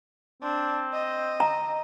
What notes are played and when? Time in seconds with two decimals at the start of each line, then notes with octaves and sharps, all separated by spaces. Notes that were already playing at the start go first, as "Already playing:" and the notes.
0.43 C4 D4
0.93 D#5
1.40 A#5